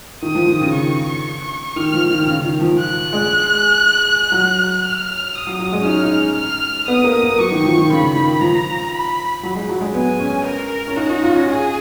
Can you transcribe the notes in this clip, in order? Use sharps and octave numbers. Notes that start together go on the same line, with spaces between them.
D#3 D#6
F3
D#3
C#3
D#3 C#6
D#3 F6
F3
D#3
C#3
D#3
F3
F#6
G#3
F#3
F6
D#6
F#3
F#3
G#3
C#4
D#4 F6
D#4
F6
B3 D#6
A#3
A#3
F#3 C#6
D#3
F3
D#3
C#3 B5
D#3
F3 A#5
B5
F#3
G#3
F#3
G#3
B3 G#5
C#4
A#4
C#4
D#4 F#4
D#4
F4
C#4
G#4